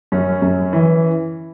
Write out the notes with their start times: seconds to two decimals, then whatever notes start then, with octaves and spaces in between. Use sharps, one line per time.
0.12 F#2 C#4
0.42 F#2
0.73 E3